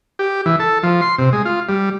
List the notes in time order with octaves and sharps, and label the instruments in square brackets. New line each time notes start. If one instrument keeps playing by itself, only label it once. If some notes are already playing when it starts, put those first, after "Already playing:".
[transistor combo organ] G4
E3
A4
F3
C6
C3
G#3
F4
G3